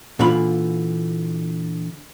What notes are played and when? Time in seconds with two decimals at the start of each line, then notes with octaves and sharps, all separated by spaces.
0.19 A#2 D3 E3 F4 B5